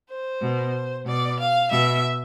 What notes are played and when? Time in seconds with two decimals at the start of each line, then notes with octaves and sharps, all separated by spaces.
0.09 C5
0.41 B2
1.06 B2 D5
1.38 F5
1.71 B2 E5